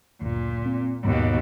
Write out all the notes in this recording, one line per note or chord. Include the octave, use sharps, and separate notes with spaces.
F#1 D2 A#2
C4
D#2 G#2 B2